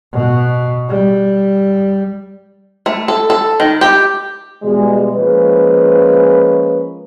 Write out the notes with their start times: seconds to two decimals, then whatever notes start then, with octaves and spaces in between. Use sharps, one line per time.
0.13 B2
0.89 G3
2.86 A3
3.08 A4
3.30 A4
3.60 D#3
3.81 G4
4.63 B2 E3 G3 G#3
5.14 F3 G#3 A#3 C#4 B4